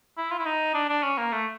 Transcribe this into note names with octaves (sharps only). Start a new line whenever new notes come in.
E4
F4
E4
D#4
D4
D4
C#4
A#3
A3